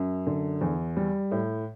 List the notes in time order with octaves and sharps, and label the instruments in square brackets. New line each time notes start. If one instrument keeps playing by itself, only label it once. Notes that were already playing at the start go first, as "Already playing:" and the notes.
Already playing: [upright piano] F#2
D3
E2
G3
A2